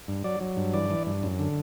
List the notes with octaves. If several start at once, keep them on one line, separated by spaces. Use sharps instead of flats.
G2
F#3 D5
F#3
G2
E3 D5
E3
G2
F#2
D3